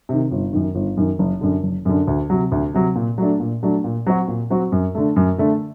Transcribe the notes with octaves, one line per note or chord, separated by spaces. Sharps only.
C3 D#3
G1
F#2 D#3
G1
F#2 D#3
F#1
F#2 D3
F#1
F#2 D3
D2
C3 F#3
D2
C3 F#3
A#2
F#3 A3 D4
A#2
F#3 A3 D4
A#2
F#3 C4 F#4
A#2
F#3 C4 F#4
F#2
D3 A3
F#2
D3 A3